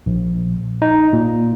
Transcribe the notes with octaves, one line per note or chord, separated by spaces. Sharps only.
A#1
D#4
A#2